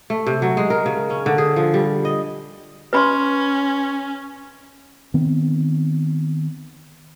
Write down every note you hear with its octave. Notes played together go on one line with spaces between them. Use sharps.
A3
C3
F#3
G#3
A#4
C#3
C#4
D3
G#4
F3
G3
D#5
C#4 B4 B5 C6
D#3 B3 C4